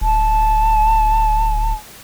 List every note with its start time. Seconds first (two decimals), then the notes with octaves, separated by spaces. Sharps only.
0.01 D1 A5